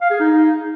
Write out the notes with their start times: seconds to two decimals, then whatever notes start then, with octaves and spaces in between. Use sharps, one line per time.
0.01 F5
0.11 G#4
0.20 D#4